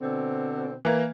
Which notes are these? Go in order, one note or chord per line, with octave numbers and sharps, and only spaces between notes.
B2 D3 C4
E3 A#3